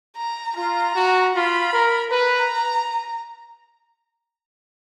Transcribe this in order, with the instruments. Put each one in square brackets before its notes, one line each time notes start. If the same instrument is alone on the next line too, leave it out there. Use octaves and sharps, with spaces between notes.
[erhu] A#5
[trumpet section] F4 [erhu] A#5
[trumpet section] F#4
[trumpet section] F4 [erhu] B5
[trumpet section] A#4
[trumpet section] B4 [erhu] A#5